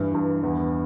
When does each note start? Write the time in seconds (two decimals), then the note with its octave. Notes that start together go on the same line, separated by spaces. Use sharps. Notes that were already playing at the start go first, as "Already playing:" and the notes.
Already playing: G2 E3
0.14 G2
0.43 E2